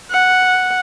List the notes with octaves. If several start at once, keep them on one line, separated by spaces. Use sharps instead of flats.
F#5